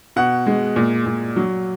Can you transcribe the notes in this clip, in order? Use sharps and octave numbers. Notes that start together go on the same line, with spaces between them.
B2 F#5
G#3
A#2
A#2
F#3